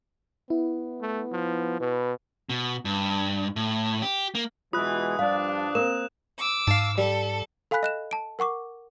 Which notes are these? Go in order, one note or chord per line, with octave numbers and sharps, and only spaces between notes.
B3 E4
A3
F3
B2 B4
B2
G2
A2
G4
A#3
B2 E3 G#3 F4 D#6 F#6
G2 F3 G3 D4 F5
A#3 C4 A#4 E7
D6 E6
G#2 F5 A5
G3 A4
A4 F5 G#5 B5 F#6 B6
D#5 F#6 E7
A5 D7
A#4 F#5 C#6 D6